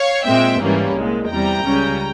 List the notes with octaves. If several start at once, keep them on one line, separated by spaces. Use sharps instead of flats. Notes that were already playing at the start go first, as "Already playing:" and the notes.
Already playing: C#5 F5
A#2 G#3 C4 E5 G5
G#2 E3 G3 A#3 C#4
C2 A#2 G#3
E2 C3 G3 G5 A#5
C#2 C#3 G3 C#4